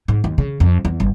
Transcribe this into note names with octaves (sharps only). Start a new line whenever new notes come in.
G#2
D#2
C#3
F2
E2
G1